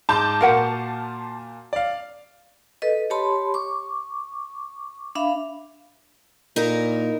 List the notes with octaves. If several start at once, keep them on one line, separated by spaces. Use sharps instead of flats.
G#2 A5 D6 G6
A#2 F#4 A#4 F5 F#5
D5 F5
A4 B4 D#5
G4 C#5 A5 B5 C6
C#6 D6
D4 E5 F5 B5
A#2 D#4 E4 A#4